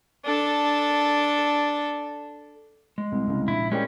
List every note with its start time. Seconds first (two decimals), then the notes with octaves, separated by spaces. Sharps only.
0.25 D4 A4
2.98 G#3
3.12 C2
3.27 C2 C#3
3.48 A#1 E4
3.72 G#3 C#4 G4 G#4 A#4 D5 G5